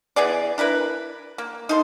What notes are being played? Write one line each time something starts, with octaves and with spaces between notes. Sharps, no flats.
E3 B3 G#4 D5
D4 E4 A#4 B4
A#3
D#4 A4 C6